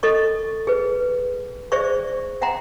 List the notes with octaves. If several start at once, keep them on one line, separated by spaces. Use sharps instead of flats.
A4 D#5 C#6
G#4 B4
G#4 C5 D5 E5 C#6
E5 F#5 G5 A#5 C6